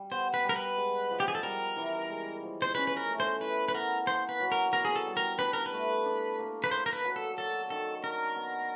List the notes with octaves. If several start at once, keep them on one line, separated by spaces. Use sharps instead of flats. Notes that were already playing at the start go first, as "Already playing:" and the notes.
Already playing: G3
B3 C5
B4
G3
A#4
B4
G#3
F3
G4
G#4
A4
G3 A#4
E3
G#3
F3
C5
C#4 B4
B4
A#4
A3
C5
E4 B4
B4
B3 A#4
A#3 C5
B4
F#3
A#4
B3 A#4
G#4
A4
G3
A#4
D4 B4
A#4
B4
A3
D4
A#3
B4
A#3 C5
A#4
B4
F#3
A4
F#3 A4
D#3 A4
D4 A#4
B3